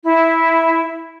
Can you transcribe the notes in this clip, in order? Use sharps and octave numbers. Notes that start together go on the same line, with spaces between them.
E4